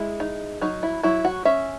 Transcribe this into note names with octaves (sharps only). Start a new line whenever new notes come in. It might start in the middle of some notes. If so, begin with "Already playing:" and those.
Already playing: G#3 E4
D#4
F#3 D#4
E4
F#3 E4
F#4
C#4 E5